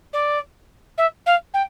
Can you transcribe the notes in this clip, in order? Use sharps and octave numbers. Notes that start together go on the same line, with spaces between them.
D5
E5
F5
G5